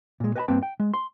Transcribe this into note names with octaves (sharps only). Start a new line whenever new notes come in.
A#2 G#3
B4 D#5 F#5 G#5 A5 B5
G2 A#3 C4 B4 G5 A5
G5
G#3
C6